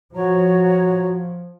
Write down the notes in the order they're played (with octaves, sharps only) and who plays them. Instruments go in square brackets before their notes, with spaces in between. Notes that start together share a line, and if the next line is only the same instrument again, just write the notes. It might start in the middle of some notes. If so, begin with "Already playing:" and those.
[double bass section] F3 [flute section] F#4 C#5 A#5